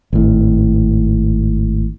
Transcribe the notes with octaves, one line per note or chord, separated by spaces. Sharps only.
G#1 A2